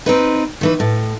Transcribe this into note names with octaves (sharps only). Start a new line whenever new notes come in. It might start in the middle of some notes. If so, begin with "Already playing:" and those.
C4 D#4 B4
D#3 E3 B4
A2